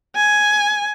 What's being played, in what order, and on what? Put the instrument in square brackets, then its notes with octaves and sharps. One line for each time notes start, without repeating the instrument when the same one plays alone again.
[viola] G#5